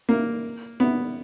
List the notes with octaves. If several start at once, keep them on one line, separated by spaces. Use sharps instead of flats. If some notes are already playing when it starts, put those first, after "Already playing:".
A#3
B3